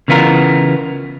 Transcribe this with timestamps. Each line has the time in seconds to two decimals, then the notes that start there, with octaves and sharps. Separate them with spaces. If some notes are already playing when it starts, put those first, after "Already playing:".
0.08 C#3 E3 B3 F4 A#4